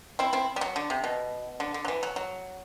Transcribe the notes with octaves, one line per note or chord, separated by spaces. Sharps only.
C4 E4
C4 E4
G3
F#3
D3
C3
B2
D3
D3
F#3
E3
F#3
F#3